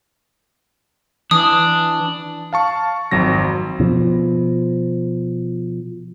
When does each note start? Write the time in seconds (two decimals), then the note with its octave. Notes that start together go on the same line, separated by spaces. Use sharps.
1.31 E3 D4 D#6
2.53 F5 A5 C#6
3.11 G#1 F2 F#3 A#6
3.80 B2 F3